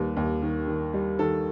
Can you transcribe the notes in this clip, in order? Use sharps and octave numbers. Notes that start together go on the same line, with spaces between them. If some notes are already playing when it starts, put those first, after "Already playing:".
Already playing: D#2 G3 B4
D#2
D#3
D#3
G3
D#3 A4